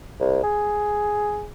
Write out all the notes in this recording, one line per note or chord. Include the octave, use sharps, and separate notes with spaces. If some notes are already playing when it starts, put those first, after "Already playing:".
C2
G#4